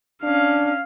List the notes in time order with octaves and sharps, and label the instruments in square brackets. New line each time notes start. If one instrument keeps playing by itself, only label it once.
[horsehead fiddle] C#4 F5 [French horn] D4